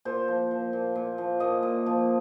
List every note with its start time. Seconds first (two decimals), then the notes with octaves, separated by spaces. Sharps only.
0.05 A#2 C5
0.28 F3
0.51 F3
0.73 A#2
0.95 A#2
1.18 F3
1.40 A#2 D#5
1.63 A#2
1.86 F3